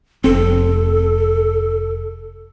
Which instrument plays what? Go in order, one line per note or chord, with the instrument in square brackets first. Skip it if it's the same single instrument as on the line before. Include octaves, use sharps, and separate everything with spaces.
[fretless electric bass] F1 C4 [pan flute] A4